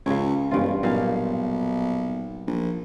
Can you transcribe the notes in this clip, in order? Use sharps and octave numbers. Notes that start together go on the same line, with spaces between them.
C#2 C#3 C#5
E1 G2 F4
B1 A#2 F5
A#1